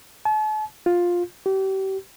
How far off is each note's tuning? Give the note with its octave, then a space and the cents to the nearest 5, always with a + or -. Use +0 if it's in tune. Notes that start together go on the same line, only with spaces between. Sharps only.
A5 -40
F4 +10
G4 -35